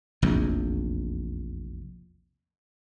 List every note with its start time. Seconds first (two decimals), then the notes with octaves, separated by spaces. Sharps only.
0.22 F1 A#1 E2